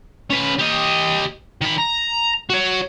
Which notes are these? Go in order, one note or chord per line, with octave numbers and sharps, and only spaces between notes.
C#4 B4
G4 D#5
D#3 B5
A#5
F#4 C#5